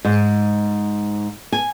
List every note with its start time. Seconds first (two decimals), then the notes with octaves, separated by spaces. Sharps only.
0.05 G#2
1.52 G#5